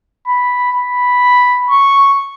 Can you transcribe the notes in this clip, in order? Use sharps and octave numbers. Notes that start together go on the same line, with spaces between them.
B5
B5
C#6